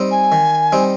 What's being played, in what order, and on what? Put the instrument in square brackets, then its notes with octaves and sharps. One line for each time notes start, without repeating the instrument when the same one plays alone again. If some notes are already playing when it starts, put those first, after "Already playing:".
Already playing: [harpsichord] G3 C4 D#4
[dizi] G#5
[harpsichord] D#3
G3 C4 D#4